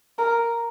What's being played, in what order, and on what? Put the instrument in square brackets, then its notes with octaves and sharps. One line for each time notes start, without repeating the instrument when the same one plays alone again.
[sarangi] A#4